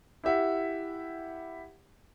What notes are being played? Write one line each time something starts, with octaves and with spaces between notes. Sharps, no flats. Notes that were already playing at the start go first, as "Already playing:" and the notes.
E4 G4 E5 F#5